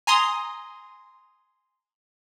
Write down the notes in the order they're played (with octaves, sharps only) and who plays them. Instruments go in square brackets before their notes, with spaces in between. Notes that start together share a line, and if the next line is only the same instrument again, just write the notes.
[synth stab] G#5 A#5 C6 D#6